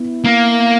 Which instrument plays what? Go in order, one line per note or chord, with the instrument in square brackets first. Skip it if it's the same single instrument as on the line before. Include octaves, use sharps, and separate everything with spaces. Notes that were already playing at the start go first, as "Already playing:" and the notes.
Already playing: [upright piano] B3 E4
[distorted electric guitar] A#3